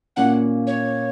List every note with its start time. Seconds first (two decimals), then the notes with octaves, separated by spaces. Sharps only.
0.16 A#2 A#3 C#4 F#5
0.67 C#5